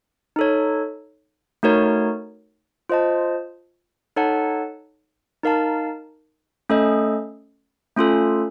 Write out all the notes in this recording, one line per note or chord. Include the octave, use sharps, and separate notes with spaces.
D#4 A4 C#5
A3 D#4 F#4 A#4 C#5
F4 C5 D#5 A5
D#4 A4 C#5 F#5 A5
D#4 A#4 F5 A5
A3 C#4 A4 D#5
A3 C#4 F4 A4